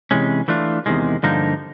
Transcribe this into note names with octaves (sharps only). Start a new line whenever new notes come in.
C3 E3 G#3 C#4
E3 A3 D4 F4
E2 C3 D#3 G#3
G2 D3 F3 A#3 D#4